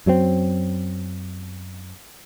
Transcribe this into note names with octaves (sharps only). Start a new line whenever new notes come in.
F#2 F#3 G#3 C4